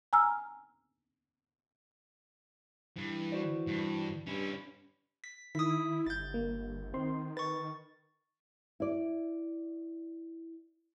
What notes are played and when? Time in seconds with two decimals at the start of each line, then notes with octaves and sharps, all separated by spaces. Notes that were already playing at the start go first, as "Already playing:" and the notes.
0.13 G#5 A#5 E6 F6
2.97 G2 E3
3.32 F#4 C5 D5
3.67 G2
4.27 G2 C#4 E4
5.24 B6
5.55 D#3 E4 D#6 B6
6.06 G1 G6 A6
6.34 A#3
6.94 D#3 C4 C6
7.37 B4 C#6 A6
8.80 E4 D5